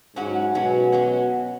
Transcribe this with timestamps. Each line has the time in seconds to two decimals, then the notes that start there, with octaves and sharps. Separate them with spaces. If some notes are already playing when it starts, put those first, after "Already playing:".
0.16 G#2 F#3 C#4 F#4
0.55 B2 F#3 C#4 F#4
0.92 F#3 C#4 F#4